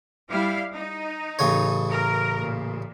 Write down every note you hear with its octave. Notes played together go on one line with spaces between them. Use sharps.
G3 E4 F5
D#4
A1 C#3 C#5
A#4
A#2